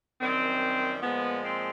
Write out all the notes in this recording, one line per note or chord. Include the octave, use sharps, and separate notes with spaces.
F#2 D#3 G3 C4
A#2 F3 G#3 B3
C4